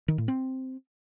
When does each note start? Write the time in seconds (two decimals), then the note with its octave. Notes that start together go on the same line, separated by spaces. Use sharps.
0.08 D#3
0.18 A2
0.28 C4